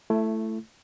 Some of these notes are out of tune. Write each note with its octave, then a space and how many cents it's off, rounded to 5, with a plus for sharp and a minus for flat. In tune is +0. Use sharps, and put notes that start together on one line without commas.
A3 +0 E4 +25